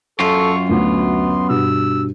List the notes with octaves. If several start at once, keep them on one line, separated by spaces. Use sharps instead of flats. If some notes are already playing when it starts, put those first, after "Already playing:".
F#2 F4 A4 C#6
D2 B3 C6
G2 B2 E6